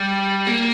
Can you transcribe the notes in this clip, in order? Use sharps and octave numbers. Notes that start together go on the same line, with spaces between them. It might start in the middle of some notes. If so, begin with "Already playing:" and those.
Already playing: G3
A#3